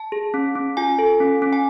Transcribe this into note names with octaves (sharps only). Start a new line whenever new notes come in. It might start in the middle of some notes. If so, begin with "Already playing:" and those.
Already playing: A5
G#4
C#4
C#4
F4 G#5
A4
C#4
C#4
G#5